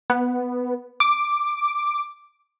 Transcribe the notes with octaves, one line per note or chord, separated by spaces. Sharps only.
B3
D6